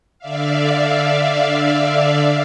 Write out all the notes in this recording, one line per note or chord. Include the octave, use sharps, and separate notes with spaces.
D3 D5 E5 F5